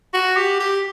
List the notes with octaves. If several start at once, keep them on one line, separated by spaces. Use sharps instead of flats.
F#4
G4
G4